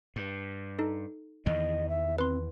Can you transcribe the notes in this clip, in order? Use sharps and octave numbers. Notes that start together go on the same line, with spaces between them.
G2
D#4 A4
E2 D#3 E3 D#5
E5
C4 B4 C6